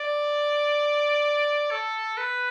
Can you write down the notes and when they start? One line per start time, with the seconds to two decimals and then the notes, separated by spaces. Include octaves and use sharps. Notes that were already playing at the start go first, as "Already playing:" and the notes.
Already playing: D5
1.71 A4
2.17 B4